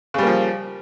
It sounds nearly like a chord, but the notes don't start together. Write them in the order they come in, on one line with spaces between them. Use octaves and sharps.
C#3 G3 A#3 F3